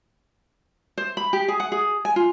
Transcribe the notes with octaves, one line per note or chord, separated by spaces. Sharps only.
C5
B5
G4
G#4
F#5
G#4
G#5
F4